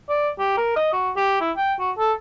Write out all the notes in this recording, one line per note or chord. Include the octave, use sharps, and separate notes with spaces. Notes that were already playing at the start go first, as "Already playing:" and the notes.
D5
G4
A#4
D#5
F#4
G4
E4
G5
F#4
A4